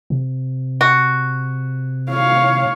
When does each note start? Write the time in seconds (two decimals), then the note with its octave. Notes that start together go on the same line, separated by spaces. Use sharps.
0.10 C3
0.81 F#4
2.10 C#5 F5